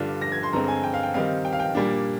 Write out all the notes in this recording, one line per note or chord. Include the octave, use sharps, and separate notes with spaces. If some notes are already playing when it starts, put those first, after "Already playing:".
Already playing: G2 D3 G3 D4 F4
A#6
G#6
C6
G2 D3 G#3 C4 A#5
G#5
G5
F5
G5
D#3 G3 C4 D#4 F5
G5
F5
G5
A#2 G3 A#3 D4